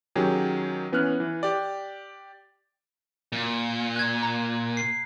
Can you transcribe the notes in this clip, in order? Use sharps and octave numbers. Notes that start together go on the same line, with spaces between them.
D#3 F#3 C#4 G4 G#4
E3 B3 C#4 B4 F6 F#6
E3
G4 D5
A#2
F#6 G#6
A#5
C7